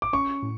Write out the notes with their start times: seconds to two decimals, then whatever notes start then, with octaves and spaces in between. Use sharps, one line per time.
0.02 D6
0.13 C#4 C#6
0.43 A2